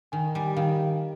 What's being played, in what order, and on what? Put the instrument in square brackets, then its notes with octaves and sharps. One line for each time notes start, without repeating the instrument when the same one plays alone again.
[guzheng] D#3 [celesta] G#5
[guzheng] G3 [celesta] G#5
[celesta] G5
[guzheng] D#3 [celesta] F5